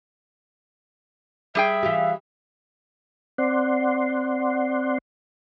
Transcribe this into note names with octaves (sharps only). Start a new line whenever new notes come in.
G3 G#4 E5 G5
E3 F4 G4
C4 D5 F#5 C6